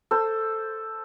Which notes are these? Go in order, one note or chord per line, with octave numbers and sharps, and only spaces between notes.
A4 C5